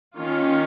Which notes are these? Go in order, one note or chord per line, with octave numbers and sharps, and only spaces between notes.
D#3 A#3 C#4 F4